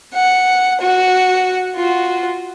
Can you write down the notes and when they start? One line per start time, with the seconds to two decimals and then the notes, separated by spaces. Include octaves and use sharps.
0.14 F#5
0.81 F#4
1.75 F4 F#4